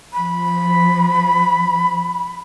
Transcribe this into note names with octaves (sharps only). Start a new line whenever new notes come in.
F3 B5